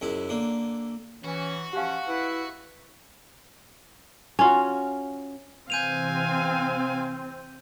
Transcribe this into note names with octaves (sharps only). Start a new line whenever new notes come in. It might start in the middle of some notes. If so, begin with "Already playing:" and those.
C#2 F#2 E4
D3 A#3
E3 C#4 F#4
F3 C#4 G4 F5 F#5
E4 B4
C#4 F4 F#4
C3 E3 C4 F5 G#5 G6 D#7 F7